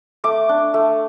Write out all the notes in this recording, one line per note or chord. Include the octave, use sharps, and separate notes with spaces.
A3 D6
D4
A3